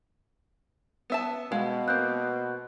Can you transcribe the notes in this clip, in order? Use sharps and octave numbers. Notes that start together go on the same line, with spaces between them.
B3 E5 A5
B2 G#3 F5
A#3 C4 F#6 G6